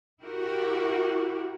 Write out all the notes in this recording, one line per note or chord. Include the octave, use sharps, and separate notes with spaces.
E4 F#4 G4 A#4